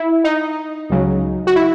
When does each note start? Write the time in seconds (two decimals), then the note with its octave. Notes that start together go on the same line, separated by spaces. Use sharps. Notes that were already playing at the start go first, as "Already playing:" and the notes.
Already playing: E4
0.24 D#4
0.90 C#2 C#3 F#3
1.47 F#4
1.56 E4